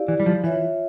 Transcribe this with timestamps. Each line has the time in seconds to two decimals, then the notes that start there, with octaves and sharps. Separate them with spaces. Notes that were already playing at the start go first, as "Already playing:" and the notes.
Already playing: E4 G4 D5 F5
0.08 E3
0.20 G3
0.26 F3
0.44 E3 F4 C#5 E5